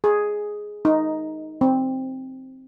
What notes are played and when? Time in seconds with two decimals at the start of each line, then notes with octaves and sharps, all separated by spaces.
0.04 G#4
0.85 D#4
1.61 C4